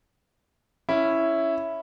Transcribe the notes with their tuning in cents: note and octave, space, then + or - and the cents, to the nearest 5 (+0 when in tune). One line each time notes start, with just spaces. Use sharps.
C#4 +0 E4 +0